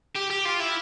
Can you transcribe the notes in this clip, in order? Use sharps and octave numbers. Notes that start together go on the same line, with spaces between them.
G4
G4
F4
E4